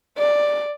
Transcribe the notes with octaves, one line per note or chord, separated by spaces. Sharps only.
D5